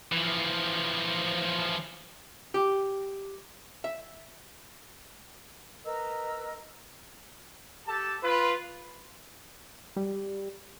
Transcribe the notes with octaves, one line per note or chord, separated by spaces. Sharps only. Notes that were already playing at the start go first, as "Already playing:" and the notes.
E3 F3
G4
E5
A#4 B4 D#5 E6
G4 A4 A5
F4 B4
G3